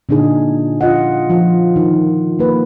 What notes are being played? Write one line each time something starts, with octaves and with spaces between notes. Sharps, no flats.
A#2 D3 D4 D#4 G#4
F4 D#5 F#5
F3 F4
D#3
A#3 B4